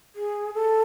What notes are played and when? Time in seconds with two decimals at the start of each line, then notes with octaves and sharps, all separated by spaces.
0.16 G#4
0.54 A4